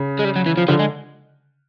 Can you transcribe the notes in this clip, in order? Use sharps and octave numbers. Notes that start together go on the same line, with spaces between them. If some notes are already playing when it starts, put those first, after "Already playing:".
Already playing: C#3
G#3
G3
F#3
E3
F3
D3 F3
G#3